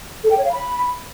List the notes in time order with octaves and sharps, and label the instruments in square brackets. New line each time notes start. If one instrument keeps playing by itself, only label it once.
[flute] A4
G5
C#5
F5
B5